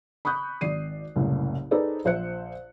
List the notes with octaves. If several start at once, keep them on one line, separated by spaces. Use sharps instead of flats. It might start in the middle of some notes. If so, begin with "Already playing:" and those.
B5 C#6 D#6 F#6 G6
G#1 D5 C7 D#7
F#1 C2 A2
D#4 G#4 A4 B4 C5 D5
A#1 C5 E5 F#6 C#7